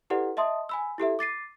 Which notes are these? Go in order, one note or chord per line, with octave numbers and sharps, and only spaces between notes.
E4 G4 A4 B4 D5 F#5
D#5 E5 A5 C6 D#6
G#5 B5 E6
E4 G4 A4 E5
D6 A6 C7 D#7